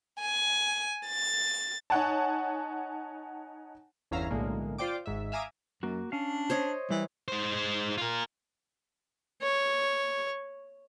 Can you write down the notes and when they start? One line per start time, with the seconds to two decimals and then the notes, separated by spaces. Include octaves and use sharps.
0.21 G#5
1.08 A6
1.90 D#4 C#5 F#5 G#5 A5
4.11 G1 E2 C#4 E5 F5 A#5
4.31 B1 A2 D3 G#3 A#3
4.78 F4 C5 D5 G5 D6
5.06 G#1 G#2 E5
5.32 E5 F5 G#5 A#5 D6 D#6
5.83 F#2 A#3 F#4
6.12 C#4 D4 F5
6.50 C5 C#5 D#5
6.90 E3 G3
7.28 G#3 C5
7.98 F4 A#4
9.42 C#5